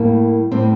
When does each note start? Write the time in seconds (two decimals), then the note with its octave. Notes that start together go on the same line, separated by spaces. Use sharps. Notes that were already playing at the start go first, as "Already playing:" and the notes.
Already playing: A2 G3 A#3
0.51 A2 G3 C4